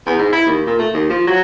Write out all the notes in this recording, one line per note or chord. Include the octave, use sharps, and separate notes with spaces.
E2
G#2
E4
D#2
A#2
A3
D#2
F3
F#3